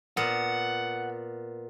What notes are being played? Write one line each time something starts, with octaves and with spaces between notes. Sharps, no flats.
A#2 B3 F#5